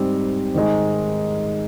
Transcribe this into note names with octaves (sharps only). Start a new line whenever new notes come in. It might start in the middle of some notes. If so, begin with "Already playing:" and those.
Already playing: G#2 G3 C4
G#2 D#3 G#3